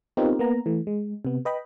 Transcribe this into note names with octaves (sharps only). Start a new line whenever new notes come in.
B3 C4 D#4 F4 G4 A#4
A#3 B3 A#5
E3 A3
G#3
C3 B3
B4 D#5 G5 B5